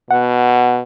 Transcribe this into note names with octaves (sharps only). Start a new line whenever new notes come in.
B2 F#5